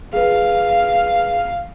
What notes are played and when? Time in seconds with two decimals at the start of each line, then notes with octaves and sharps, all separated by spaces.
0.13 G#4 B4 F5